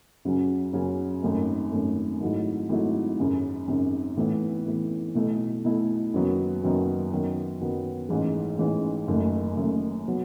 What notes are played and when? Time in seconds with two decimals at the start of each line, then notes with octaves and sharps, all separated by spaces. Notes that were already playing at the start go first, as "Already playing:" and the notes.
0.25 F#2 C#3 F#3 C#4
0.73 F#2 C#3 F#3 C#4
1.23 G#1 F#2 D#3 A3
1.72 G#1 F#2 D#3 A3
2.20 G#1 G#2 F#3 A3 E4
2.69 G#1 G#2 F#3 A3 E4
3.19 G#1 F#2 C#3
3.68 G#1 F#2 C#3
4.17 A2 E3 B3 E4
4.66 A2 E3 B3 E4
5.15 B1 B2 A3 E4
5.65 B1 B2 A3 E4
6.13 F#1 F#2 D#3 F#3 B3
6.62 F#1 F#2 D#3 F#3 B3
7.11 F#2 D#3 F#3 B3
7.60 F#2 D#3 F#3 B3
8.09 A1 G#2 E3 G#3 C#4
8.58 A1 G#2 E3 G#3 C#4
9.08 F#1 F#2 D#3 A3
9.56 F#1 F#2 D#3 A3
10.07 B2 F#3 B3